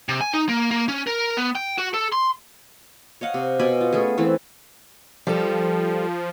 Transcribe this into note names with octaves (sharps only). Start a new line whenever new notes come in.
C3
G#5
D#4
A#3
A#3
C#4
A#4
B3
G5
F#4
A4
C6
C#5 D#5 F5 F#5
C3
B2 D5 G#5 B5
F4
A3 B3 C#4 G#4
E3 A3 C4
F3 G3 A4